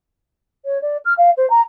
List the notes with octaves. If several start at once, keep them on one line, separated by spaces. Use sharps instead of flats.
C#5
D5
F6
F5
C5
A#5